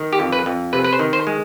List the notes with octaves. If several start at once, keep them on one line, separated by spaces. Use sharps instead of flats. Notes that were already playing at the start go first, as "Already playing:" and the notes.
Already playing: D#3
G4
F2
B4
F2
C3 B4
B4
C5
D#3
C5
G#3